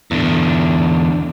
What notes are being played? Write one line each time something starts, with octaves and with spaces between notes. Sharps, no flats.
E2 D3